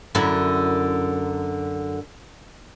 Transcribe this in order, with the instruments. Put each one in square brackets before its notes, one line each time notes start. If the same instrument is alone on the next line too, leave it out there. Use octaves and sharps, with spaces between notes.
[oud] F#2 D3 E4